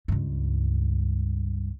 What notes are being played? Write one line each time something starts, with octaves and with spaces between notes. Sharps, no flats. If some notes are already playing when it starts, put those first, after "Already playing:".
C#2 G2